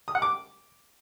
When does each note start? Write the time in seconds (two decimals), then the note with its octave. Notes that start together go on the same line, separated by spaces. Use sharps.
0.08 D#6
0.15 F#5
0.22 D6